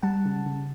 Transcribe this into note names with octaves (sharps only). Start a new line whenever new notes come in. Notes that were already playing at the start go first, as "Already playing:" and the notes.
G3 F#5 A5
C#3
C#3